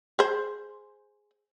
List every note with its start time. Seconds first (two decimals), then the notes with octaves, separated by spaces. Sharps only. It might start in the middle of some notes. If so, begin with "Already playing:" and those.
0.19 G#4 C5